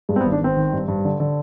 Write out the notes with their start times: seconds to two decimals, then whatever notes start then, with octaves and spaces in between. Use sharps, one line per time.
0.09 G2 G#3
0.16 C4
0.21 B3
0.25 G#1
0.32 D4
0.41 G#1 C4
0.57 D#3
0.73 G2
0.88 G2
1.05 D3
1.20 D3